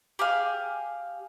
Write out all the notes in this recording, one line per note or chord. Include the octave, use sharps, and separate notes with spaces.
G4 G#4 F5